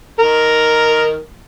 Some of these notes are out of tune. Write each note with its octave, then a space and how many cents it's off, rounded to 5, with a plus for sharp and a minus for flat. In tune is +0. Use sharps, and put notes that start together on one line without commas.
D#3 +0 A#4 +0